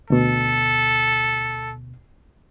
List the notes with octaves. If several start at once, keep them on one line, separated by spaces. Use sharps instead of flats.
D2 B2 A4